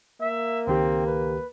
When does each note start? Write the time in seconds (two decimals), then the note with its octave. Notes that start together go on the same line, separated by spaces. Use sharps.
0.21 A#3 E5
0.67 C#2 D#3 C4 G4
1.06 B4